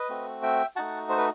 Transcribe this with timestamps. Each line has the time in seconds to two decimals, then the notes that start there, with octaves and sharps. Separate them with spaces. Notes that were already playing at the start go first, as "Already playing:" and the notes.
Already playing: B4 D#5
0.09 A3 C4 F#4
0.43 E5 G5
0.76 A3 D#4 F#4 F#5 A5
1.09 C5
1.18 B4